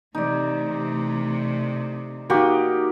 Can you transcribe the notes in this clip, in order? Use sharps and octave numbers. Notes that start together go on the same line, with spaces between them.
C3 E3 A3 D#4 D5
A#3 D#4 F#4 G4